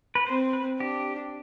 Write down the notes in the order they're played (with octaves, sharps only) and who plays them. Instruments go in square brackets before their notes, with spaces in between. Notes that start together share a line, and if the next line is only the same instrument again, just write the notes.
[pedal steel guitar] B4
[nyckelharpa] C4 [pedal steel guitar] C5
[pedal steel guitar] B4
[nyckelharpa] D4 [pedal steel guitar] G4